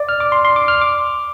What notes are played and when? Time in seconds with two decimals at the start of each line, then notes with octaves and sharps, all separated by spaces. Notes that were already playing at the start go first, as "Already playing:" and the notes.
Already playing: D5
0.09 F6
0.20 D6
0.32 C6
0.45 C6
0.56 D6
0.68 F6
0.82 D6